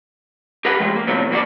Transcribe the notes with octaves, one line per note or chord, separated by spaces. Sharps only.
G4 A#4 B4 F#5
E3 G#3 A3 G4
A#3
A2 C3 F3 F#3 B3
E3 A#3 F#4 D5